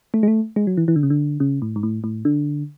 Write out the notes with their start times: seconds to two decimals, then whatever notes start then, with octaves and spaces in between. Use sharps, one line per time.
0.14 A3
0.23 G#3
0.28 A3
0.56 G#3
0.67 F#3
0.77 E3
0.88 E3
0.96 D3
1.03 C#3
1.10 D3
1.40 C#3
1.62 A2
1.76 G#2
1.83 A2
2.04 A2
2.25 D3